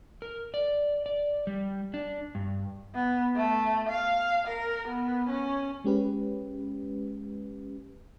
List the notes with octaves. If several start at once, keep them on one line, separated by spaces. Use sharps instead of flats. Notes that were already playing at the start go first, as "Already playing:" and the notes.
A#4
D5
D5
G3
D4
G2
B3
A3
F5
A#4
B3
C#4
G#3 C#4 G4 B4